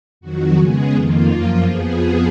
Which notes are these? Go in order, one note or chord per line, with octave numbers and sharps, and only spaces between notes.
F2 D#3 F#3 F#4
C#3 G#3 B3 G#4
F2 D#3 A#3 F4
F#2 F3 A#3
F2 F3 B3 G#4